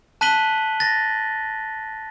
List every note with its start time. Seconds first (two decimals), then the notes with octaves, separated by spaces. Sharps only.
0.21 A5 F#6 B6 D#7 F#7 G7
0.80 A6 A#6